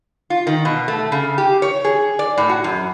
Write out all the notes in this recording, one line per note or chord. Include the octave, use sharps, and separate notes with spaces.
F4
D#3
B2
A3
C#3
G4
C#5
G#4
D5
A2
F#4
F#2